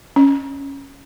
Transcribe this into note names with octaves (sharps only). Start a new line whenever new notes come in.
C#4